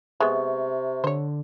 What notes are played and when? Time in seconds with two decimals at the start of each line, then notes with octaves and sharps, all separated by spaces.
0.20 C3 G#3 B3 E5 C#6
1.04 D3 C5 C#5